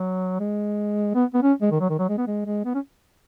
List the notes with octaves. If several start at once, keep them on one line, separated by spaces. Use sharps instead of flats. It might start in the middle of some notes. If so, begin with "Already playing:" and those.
Already playing: F#3
G#3
B3
B3
C#4
G#3
D#3
F#3
D#3
F#3
G#3
B3
G#3
G#3
B3
C#4